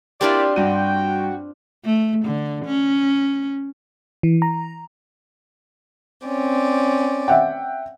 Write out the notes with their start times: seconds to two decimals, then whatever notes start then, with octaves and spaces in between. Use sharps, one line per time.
0.21 C4 D4 E4 F4 G4 A#4 D5
0.56 G2 F#4 G5 D#7
1.85 A3
2.25 D3
2.65 C#4
4.23 E3
4.42 A#5
6.26 C4 C#4 D5
7.28 E5 F#5 G5